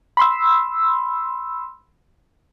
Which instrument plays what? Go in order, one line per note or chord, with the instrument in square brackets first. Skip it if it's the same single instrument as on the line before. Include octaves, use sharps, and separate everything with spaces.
[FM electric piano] B5 C6 E6